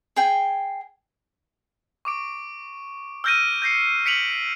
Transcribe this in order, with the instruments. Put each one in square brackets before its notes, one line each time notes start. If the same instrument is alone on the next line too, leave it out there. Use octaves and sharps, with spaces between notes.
[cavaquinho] G#4 G5 G#5
[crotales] C#6 D6 D7
E6 F6 G6 A#6 D7 D#7
G6 A#6 C7 C#7
B6 C#7 D7 F7 F#7